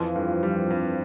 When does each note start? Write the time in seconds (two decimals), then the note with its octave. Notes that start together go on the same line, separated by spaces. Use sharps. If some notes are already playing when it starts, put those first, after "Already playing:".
Already playing: F2 E3 F3
0.16 G2
0.43 G3
0.70 G2